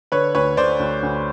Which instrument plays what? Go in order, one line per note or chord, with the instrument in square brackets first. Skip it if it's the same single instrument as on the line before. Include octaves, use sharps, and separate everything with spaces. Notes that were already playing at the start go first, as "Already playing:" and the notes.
[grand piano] D3 B4 C#5
D2 B4 C#5
D3 C5 D5
D2
D2